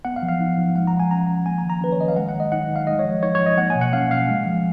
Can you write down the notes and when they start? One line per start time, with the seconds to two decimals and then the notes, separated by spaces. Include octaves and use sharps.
0.05 B3 F#5
0.16 F5
0.23 F3
0.29 F5
0.40 D#4
0.58 F3
0.75 G#3 F#5
0.87 A#5
0.93 F3
1.00 G#5
1.11 C#4 A#5
1.28 F3
1.46 A#3 G#5
1.58 A#5
1.63 D#3
1.70 A#5
1.81 C#4 B4
1.92 C#5
1.99 D#3 D#5
2.08 F5
2.16 G#3 F#5
2.29 F#5
2.34 D#3
2.40 D#5
2.52 D#4 F#5
2.69 D#3
2.76 F5
2.87 G#3 D#5
2.99 C#5
3.05 F3
3.23 D#4 C#5
3.35 C#5
3.40 F3
3.46 D#5
3.58 A#3 F#5
3.70 G#5
3.75 B2
3.81 F#5
3.93 C#4 F5
4.11 B2 F5
4.29 G#3
4.46 F3